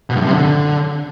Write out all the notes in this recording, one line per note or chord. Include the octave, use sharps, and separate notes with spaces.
B2
G2
F#2
C3
D3